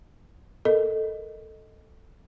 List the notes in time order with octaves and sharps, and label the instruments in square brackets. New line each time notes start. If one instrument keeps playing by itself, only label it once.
[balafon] A4 A#4 D#5